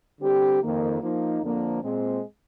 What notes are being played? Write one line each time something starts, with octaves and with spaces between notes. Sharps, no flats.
D3 G3 C4 G4
F2 D#3 A#3
F3 A#3 D#4
F2 D3 F3 A#3 D4
A#2 G#3 C4